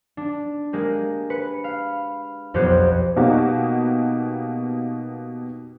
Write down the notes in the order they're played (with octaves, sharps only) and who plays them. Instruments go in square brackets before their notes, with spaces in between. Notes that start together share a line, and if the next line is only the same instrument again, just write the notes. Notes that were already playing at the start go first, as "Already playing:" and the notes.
[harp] D4
G#3 A#3 G4
B4 C#7
F5
B1 F2 B3 G4 C5 F#6
[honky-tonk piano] B2 A#3 D#4 F#4 G4